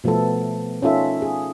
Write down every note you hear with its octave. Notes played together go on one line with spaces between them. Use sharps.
B2 F3 A3 B3 A4
C#4 D#4 F4 A4 E5
G#4